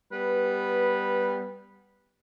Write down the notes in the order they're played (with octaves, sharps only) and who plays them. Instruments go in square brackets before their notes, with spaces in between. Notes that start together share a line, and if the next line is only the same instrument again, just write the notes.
[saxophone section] G3 B3 B4